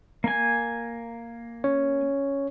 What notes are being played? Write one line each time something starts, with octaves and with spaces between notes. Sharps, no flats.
A#3 G#5
C#4 C#5